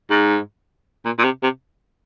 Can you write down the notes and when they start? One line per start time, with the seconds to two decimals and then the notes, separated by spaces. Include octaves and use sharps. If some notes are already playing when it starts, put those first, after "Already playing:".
0.10 G#2
1.05 A#2
1.19 A#2
1.24 C3
1.43 C3